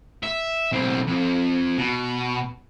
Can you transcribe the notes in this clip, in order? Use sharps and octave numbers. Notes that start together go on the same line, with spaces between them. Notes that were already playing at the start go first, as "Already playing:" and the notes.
E5
B1 C4
F2
B2